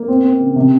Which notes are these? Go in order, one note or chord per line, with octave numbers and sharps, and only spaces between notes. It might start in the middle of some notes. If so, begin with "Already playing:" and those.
Already playing: A#3
C4
C4
C#3
C3